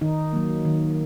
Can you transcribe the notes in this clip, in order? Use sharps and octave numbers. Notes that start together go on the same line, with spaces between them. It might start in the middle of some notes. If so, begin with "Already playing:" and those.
D#3 D#4
F#3 A#3
D#3